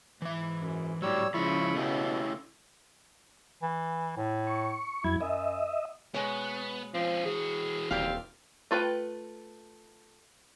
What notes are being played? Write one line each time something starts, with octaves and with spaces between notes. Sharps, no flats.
G#2 E3 E5
F#2
A2 F#3 G3 C#5 E6
C#3 F3 G#3 E4 B5 C#6
B2 A3 C#4 G4
E3
A2
C#6
F2 F#3 E4 G#6
F#2 D#5 E5
B2 G#3 B3 C#5
F3 C4 C#4
E3 F#4 G#4
D#1 C4 G4 D5 F5
A3 F4 B4 G5